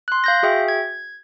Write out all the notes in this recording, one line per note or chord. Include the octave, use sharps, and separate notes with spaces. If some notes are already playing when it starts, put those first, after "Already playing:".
C6 F#6
F5 G6 A#6
F#4 G#4 E5 G5
G#6